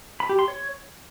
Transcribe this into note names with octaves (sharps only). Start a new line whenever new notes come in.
B5
G4
C6
C#5